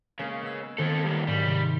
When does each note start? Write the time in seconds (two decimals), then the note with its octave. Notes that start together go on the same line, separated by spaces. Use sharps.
0.19 C#3 G#3 A#3
0.42 B3 E6
0.78 D#3 A#3 C4 A4
1.04 G2 A#3 G4
1.27 G#2 F#3 G3
1.45 C3